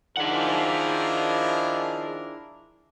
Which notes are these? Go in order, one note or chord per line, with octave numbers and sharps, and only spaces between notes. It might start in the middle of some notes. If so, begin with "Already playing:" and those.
D#3 F3 D4 E4 G#4 A#4 F#5